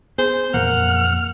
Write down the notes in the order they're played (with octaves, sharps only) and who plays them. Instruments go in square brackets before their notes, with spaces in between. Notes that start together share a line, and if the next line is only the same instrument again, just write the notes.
[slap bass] B3 [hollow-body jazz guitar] G#4 [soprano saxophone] C5
[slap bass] F2 A#2 E3 [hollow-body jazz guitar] A#3 [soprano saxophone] F#5 [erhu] F6